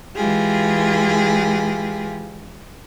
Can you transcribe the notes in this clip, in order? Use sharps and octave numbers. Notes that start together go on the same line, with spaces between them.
E3 G#3 F4 G4 G#4